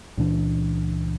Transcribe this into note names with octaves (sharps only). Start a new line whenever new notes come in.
C#2 A#2 E3 D4